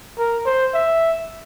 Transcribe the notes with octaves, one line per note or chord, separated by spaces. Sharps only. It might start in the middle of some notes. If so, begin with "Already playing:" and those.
A#4
C5
E5